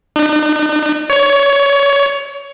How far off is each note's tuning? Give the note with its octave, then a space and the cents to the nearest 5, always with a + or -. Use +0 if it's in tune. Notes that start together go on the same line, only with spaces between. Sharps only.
D#4 -45
C#5 +20